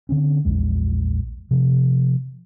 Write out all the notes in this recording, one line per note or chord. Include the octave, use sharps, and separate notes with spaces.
D3 C4 C#4
A#1 E2 G#3
C3 F3